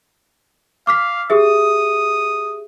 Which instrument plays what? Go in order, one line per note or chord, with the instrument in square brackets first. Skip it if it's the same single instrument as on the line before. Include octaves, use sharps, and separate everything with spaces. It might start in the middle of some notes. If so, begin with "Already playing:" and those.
[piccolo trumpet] F5 [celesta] D6 F6 B6
[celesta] G4 G#4 E5 [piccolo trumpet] D#6